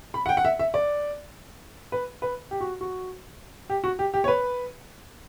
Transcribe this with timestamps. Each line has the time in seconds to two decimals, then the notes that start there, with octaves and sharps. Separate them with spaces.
0.14 B5
0.26 F#5
0.29 G5
0.37 F#5
0.45 E5
0.59 E5
0.74 D5
1.92 B4
2.22 B4
2.51 G4
2.61 F#4
2.81 F#4
3.70 G4
3.84 F#4
3.99 G4
4.14 G4
4.24 C#5
4.28 B4